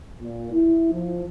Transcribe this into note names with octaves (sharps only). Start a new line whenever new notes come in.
A#2
E4
F3